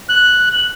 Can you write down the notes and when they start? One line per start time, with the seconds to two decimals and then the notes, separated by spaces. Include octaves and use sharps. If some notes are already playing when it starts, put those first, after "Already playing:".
0.09 F#6